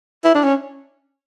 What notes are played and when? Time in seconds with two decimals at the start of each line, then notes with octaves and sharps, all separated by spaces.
0.24 E4
0.35 D4
0.44 C#4